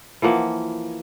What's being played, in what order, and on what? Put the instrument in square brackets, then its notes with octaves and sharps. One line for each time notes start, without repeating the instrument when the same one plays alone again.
[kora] E3 F3 A#3 F#5